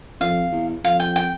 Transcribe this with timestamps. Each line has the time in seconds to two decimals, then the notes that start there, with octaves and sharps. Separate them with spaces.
0.21 F2 F5
0.52 E2
0.84 F2 F5
1.00 G5
1.16 G5